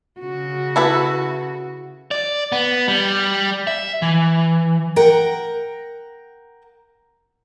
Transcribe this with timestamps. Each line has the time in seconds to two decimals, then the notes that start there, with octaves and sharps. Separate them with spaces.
0.20 C#3 F#4
0.76 E4 A4 B4
2.11 D5
2.52 B3
2.88 G3
3.67 E5
4.02 E3
4.96 A#4 F#5 G5